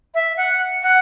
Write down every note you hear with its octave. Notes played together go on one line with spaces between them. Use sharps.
E5
F#5
F#5